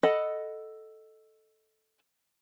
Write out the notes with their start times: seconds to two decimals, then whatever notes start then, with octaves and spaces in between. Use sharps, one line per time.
0.03 A4 D#5 F#5 B5